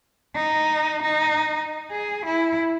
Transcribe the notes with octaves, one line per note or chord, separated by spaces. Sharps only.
D#4
D#4
G#4
E4